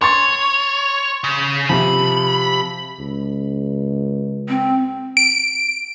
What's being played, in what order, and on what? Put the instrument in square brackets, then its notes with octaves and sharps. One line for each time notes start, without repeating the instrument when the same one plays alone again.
[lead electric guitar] C#5 [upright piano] C6 C#6 A6
[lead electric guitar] C#3
[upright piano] C3 F3 [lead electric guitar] B5
[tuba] C#2
[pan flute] C4
[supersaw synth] D7